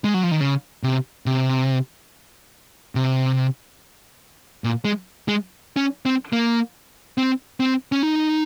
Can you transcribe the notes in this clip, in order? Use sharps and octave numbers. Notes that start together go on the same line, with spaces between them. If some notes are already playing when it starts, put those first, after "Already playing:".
G#3
F#3
F3
D#3
C#3
C3
C3
C3
A#2
G#3
G#3
C#4
C4
A#3
C4
C4
C#4
D#4